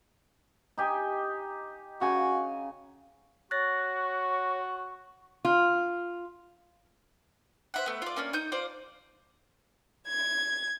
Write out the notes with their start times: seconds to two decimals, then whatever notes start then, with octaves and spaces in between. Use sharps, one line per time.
0.78 D#4 G4 G#5
2.01 C#3 F#4 G#5
3.51 F#4 C#5 C#6 F#6 A6 A#6
5.45 F4
7.74 C5 E5 F#5
7.86 A3 B3
8.02 F4 D5
8.16 A#3 C#4 D4
8.33 D#4 D#6 G6
8.52 F4 C5 D5
10.08 G#6